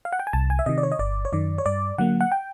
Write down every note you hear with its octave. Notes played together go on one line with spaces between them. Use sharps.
F5
F#5
G5
G#5
C2 A5
G#5
E5
C3 D#3 D#5
D5
C#5
D#5
G1 D5
C#5
F#2 D#3 D5
C#5
G2 D5
D3 F#3 A#3 F#5
F#5
G5